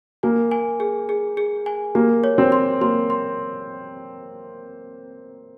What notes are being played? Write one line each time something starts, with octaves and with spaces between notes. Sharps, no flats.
A#3 G#5
G#5
G#4
G#4
G#4
G#5
A#3 G4
C#5
C4
C6
A#3 C6
C6